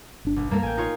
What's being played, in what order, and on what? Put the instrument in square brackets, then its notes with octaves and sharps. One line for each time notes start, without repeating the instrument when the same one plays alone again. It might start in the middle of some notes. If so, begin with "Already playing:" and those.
[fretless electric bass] G1 D4
[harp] B1
[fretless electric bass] F#2 G3 G#3 [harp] A#3 A4 A#4
[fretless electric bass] A1 [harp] G5 G#5
[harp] D#4 F4 C#5